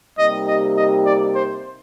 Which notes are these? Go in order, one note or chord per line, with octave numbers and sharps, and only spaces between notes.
C3 G3 A#3 D#4 G4 D#5
D#5
D#5
D5
C5